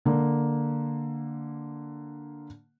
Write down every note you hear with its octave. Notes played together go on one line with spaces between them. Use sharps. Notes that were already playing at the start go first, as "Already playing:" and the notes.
D3 A#3